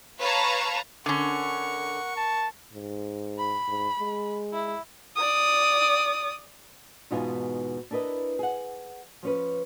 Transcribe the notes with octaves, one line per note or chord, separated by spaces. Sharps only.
B4 C#5 F5 A5 A#5
D3 C#4 A#4 F#5 C#6
A5
G#2
B5
G#2
G#3
E4
D5 D#6
E2 G#2 B2 D#4 F4 G#5
D4 E4 A#4 B4 D#5
G#4 F#5
F3 C#4 B4